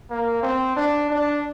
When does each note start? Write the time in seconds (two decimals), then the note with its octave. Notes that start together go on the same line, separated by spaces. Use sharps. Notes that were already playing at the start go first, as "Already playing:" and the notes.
0.11 A#3
0.43 C4
0.77 D4
1.10 D4